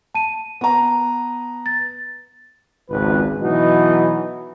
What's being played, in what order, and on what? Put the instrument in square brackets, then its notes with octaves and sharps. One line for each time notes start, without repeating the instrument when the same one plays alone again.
[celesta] A5 D#7
[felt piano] B3 A#5
[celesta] A6
[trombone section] G#1 C#2 B4
B2 E3 F#3 B3 D#4 F#4